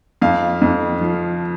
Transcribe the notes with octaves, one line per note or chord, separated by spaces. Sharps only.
F2 F5
F2
F3